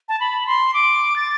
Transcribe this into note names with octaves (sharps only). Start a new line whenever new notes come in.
A5
B5
C6
D6
A6